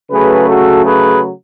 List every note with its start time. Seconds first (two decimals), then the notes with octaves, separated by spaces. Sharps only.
0.10 C#3 F#3 A3 G#4 B4
0.48 F#4 A4
0.85 G#4 B4